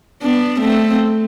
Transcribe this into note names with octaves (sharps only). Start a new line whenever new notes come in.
B3 D4
A3 C4